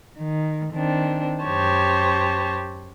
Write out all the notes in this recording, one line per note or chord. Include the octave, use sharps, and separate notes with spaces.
D#3
D#3 C4 D4
F#2 G4 C5 C#5 A5